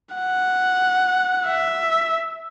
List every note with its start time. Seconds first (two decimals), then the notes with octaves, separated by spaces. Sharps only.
0.15 F#5
1.46 E5